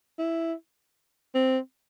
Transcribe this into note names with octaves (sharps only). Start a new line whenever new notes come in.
E4
C4